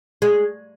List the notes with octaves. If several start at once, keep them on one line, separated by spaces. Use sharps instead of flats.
G#3